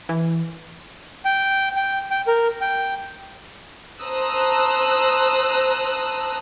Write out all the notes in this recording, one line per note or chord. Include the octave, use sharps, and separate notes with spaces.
E3
G5
G5
G5
A#4
G5
C5 A5 A#5 D#6 E6 F#6